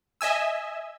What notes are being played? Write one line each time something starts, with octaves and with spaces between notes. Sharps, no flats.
D#5 E5 G#5 E6